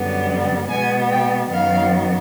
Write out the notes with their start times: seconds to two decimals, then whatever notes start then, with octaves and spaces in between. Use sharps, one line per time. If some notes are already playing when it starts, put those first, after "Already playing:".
Already playing: F#2 D3 G3 B3
0.70 B2 G#3 B3 G#5
1.10 G5
1.51 F#2 D#3 F#3 B3 F5